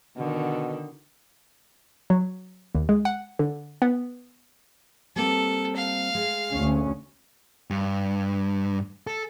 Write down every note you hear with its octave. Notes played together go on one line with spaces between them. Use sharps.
B2 D3 D#3
F#3
D#2
G#3
F#5
D3
B3
G3 A#3 C4 A4
F5
G#3
D2 C#4
G2
A4